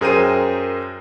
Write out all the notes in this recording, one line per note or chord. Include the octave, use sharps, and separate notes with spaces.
F#2 G#4 A#4 C5 G5 D#7